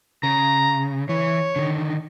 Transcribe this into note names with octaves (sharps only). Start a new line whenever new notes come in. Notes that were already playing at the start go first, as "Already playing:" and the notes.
C#3 A#5
E3 C#5
D3 D#3